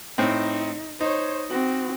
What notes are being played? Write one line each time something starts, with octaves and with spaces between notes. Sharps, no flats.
A2 C4 D#4
D#4 C5 C#5
C4 F#4